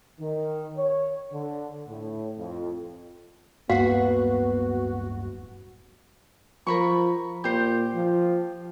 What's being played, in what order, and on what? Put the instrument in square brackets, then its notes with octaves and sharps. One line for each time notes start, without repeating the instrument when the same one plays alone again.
[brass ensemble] D#3
C#5
D3
A2
F2
[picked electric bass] D1 G2 A#3 [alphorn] B3 [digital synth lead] F#4 [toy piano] F5 F#5
[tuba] F3 [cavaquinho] A#4 B5 C#6
[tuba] A#2 [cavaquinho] G4 C5
[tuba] F3